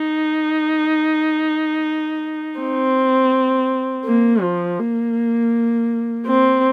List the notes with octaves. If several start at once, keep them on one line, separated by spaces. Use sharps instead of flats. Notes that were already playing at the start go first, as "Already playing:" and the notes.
Already playing: D#4
C4
A#3
F3
A#3
C4